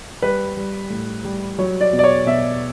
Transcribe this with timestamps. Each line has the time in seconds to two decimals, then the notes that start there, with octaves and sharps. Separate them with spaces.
0.22 G3 B4
0.57 G3
0.90 A2
1.24 G3
1.58 F#3 C#5
1.81 D5
1.93 B2
1.99 D5
2.04 C#5
2.26 B2 E5